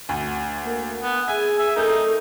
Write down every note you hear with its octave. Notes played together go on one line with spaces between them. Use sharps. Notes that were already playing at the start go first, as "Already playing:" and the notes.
D2
A#3
B3 B4
G#4 E5 G#5
E5
A3 D#4 A#4 G6